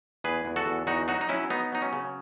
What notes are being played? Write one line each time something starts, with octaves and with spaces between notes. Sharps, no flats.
E2 G#4 B4
E2
F#4 A4
E2
E2 D#4 F#4
F#3 D#4 F#4
D#4
F#3 C#4 E4
B3 D#4
F#3 D#4
C#4
C#3